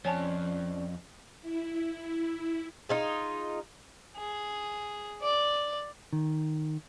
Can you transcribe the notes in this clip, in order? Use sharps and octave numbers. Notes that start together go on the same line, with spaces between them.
F2 F3 C#4 C#5 D5 G#5 A5
E4
D#4 F4 G#4
G#4
D5
D#3